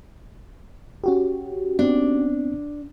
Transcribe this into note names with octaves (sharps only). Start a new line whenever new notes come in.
C#4 F#4 G4
B3 C4 D4